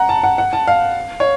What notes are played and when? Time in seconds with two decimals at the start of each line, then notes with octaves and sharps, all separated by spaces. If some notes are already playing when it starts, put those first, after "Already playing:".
Already playing: F#5 A#5
0.09 A5
0.23 F#5
0.38 F#5
0.53 A5
0.68 F5
1.20 C#5